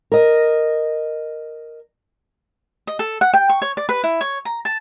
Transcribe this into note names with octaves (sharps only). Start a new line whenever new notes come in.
A#4 D#5
D#5
A4
F#5
G5
C#6
C#5
D5
B4
E4
C#5
A#5
A5